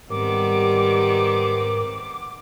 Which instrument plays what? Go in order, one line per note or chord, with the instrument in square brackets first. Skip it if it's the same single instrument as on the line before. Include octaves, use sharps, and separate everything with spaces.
[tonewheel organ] G#2 A#4 [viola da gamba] D#3 B3 C4 [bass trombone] G3 [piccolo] D6